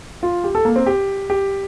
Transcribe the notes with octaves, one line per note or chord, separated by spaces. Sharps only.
F4
G4
A4
A#3
C4
G4
G4